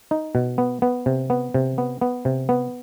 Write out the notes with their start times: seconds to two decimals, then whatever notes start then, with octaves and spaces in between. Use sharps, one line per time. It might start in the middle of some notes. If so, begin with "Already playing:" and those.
0.11 D#4
0.35 B2
0.58 B3
0.82 B3
1.06 C3
1.30 B3
1.54 C3
1.78 B3
2.01 B3
2.25 C3
2.49 B3